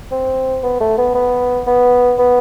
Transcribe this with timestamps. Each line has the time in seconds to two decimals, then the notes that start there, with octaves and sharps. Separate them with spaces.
0.11 C4
0.63 B3
0.80 A3
0.98 B3
1.15 B3
1.67 B3
2.19 B3